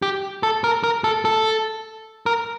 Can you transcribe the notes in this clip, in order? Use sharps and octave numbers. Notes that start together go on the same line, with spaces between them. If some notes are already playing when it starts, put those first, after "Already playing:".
G4
A4
A#4
A#4
A4
A4
A#4